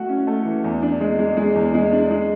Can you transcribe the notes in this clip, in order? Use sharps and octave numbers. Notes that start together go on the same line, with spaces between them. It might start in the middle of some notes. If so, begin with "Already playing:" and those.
Already playing: A3 F#4
C#4
A3
E3
E2
D4
G#3
G#3
G#3
E2
G#3
D4
G#3